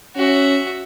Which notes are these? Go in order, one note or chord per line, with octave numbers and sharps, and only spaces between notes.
C#4 F#4 E5